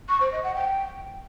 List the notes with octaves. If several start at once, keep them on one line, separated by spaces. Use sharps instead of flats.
C#6
C5
D#5
F#5
G5